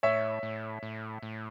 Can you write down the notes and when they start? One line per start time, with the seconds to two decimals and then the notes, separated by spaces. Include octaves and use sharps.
0.03 A2 C#5 E5
0.43 A2
0.83 A2
1.23 A2